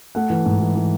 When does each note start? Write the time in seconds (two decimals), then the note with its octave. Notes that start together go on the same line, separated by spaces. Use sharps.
0.15 A3 F#5
0.30 E3
0.46 G#2
0.60 E3
0.76 E3